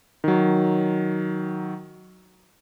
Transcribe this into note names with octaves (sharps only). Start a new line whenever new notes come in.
D#3 F#3